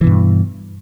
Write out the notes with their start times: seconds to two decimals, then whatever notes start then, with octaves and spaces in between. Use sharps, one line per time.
0.01 E3
0.04 B2
0.07 G2